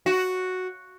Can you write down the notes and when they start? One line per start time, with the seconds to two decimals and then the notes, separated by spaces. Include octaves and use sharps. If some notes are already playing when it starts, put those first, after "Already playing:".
0.06 F#4